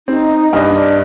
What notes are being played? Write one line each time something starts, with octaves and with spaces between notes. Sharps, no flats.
C4 D#4
G2 D4 D#5